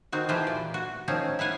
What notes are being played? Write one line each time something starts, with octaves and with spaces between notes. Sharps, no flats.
D#3 C4 F#4
E3 F3 F4 G4 C5
A#2 D5
F#4
D#3 F3 C4 C#4
E4 F5 F#5 G#5